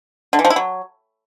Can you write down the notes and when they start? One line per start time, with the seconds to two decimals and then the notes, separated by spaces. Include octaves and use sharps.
0.33 D3
0.39 E3
0.45 F3
0.50 E4
0.56 F#3